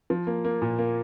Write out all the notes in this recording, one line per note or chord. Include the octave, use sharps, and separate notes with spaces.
F3
A#3
A#3
A#2
A#3